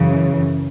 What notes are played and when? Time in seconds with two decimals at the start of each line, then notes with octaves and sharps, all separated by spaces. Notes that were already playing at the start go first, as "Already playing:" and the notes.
Already playing: F#2 C#3 E3